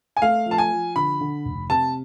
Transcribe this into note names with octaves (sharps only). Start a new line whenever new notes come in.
G#5
A3 F5
F3
A5
G#5
F3
D3 B5
D3
F1
C3 A5